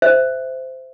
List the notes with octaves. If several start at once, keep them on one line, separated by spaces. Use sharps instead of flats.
C5 E5